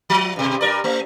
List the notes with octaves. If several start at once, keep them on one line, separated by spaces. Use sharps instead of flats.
F3
G2 B2
G2 A#4 D5
A3